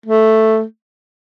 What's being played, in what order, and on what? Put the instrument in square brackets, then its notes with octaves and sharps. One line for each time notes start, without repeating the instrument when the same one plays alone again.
[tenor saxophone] A3